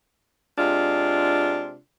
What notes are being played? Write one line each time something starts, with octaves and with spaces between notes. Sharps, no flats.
C3 G#3 D4 F4